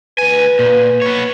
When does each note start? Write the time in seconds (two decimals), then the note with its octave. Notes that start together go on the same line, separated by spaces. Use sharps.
0.18 D2 B4 G#5
0.59 A#2
1.02 B3 C#5